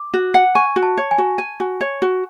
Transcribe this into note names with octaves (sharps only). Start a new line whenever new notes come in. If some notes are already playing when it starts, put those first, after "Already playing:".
Already playing: D6
F#4
F#5
G#5 C#6
F#4
A5
C#5
G#5
F#4
G#5
F#4
C#5
F#4